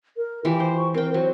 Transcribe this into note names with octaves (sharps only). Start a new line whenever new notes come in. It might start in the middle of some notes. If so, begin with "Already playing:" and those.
A#4
E3 F4 G4
C5
C#6
C4 A#4 G5
F#3 C5